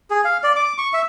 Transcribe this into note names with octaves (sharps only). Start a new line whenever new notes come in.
G#4
F5
D5
D6
C#6
E5